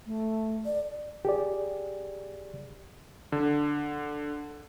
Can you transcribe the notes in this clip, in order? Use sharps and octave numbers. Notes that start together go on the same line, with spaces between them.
A3
D5
G4 G#4 D5
D3